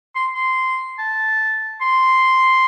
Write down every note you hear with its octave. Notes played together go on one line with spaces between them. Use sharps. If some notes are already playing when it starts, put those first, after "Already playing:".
C6
C6
A5
C6